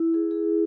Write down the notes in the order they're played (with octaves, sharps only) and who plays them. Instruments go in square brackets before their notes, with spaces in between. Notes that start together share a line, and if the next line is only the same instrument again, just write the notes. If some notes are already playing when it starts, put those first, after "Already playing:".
Already playing: [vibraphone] E4
G#4
G#4